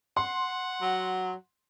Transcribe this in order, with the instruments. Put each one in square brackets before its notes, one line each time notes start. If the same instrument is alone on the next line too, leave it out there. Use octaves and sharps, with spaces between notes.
[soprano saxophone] F#5 [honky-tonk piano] C6
[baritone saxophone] F#3